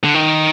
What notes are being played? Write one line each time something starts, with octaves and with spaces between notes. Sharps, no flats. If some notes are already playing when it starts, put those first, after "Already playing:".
D3
D#3